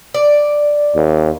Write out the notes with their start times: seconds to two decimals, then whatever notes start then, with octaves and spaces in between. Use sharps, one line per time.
0.14 D5
0.95 D#2